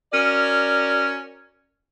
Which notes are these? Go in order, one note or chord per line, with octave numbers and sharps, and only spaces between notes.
C#4 F#4 A#4 D5